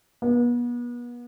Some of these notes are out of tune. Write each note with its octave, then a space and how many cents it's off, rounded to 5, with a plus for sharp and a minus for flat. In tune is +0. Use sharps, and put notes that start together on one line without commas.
B3 -35